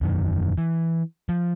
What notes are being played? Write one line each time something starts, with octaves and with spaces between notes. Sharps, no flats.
E1 F#2 D#3
E3
F3